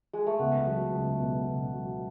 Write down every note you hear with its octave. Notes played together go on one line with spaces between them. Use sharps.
G#3
A3
C#2 B3
F#3
C#2
B2
C#2
F#3